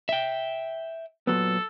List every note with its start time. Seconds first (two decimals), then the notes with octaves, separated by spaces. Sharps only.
0.09 E5 G5
1.27 A#2 F#3 B3 A4